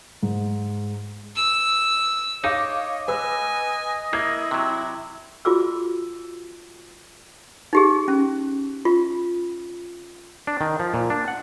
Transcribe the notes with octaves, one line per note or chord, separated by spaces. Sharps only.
G#2
E6
D#4 C#5 D#5 F5 D6
B4 G#5 E6
A#3 E4 G#6
C3 F#3
F4 F#4 G#4 D6 E6
D#4 G4 G#4
C#4
F4
D4
D#3
F3
A#2
D4
F#5